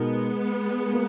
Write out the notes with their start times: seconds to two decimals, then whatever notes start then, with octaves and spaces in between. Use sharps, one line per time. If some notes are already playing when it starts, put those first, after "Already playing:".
Already playing: B2 G#3 B3 D#4 A#4
0.93 A#3